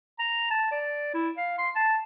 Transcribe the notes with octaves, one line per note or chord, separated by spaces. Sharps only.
A#5
A5
D5
E4
F5
C6
A5